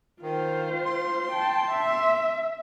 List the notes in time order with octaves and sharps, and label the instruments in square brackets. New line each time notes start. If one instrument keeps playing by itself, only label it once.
[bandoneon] D#3 [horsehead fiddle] F4 C5
[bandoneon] C6
[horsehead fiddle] G5 A5
E5